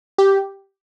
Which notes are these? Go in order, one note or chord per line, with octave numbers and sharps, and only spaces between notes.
G4